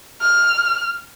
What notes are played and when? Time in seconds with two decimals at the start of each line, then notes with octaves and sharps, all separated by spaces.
0.21 F6